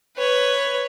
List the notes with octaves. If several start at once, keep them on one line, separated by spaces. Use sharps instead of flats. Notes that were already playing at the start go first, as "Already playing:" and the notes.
B4 C#5